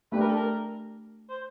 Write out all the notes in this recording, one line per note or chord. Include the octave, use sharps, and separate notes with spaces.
A3 D4 G4 B4
A#4
A4
A#4
C5